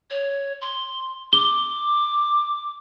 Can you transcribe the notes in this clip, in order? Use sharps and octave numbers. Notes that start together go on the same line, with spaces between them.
C#5
C6
D6 G7